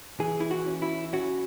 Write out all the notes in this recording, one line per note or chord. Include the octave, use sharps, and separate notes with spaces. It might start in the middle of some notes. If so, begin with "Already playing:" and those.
E3 G#4
E4
F#4
C#4
E4
C#4 F#4